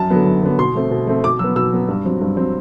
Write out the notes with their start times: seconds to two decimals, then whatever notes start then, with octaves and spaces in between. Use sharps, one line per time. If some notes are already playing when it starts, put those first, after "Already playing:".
Already playing: F#2 A5
0.10 D3 F#3 B3
0.26 F#2
0.42 D3 F#3 B3
0.58 B2 C6
0.75 A3 C4
0.91 B2
1.07 A3 C4
1.24 B2 D6
1.39 F#3 B3 E6
1.56 B2 E6
1.72 F#3 B3
1.88 G2
2.05 F#3 C4
2.21 G2
2.37 F#3 C4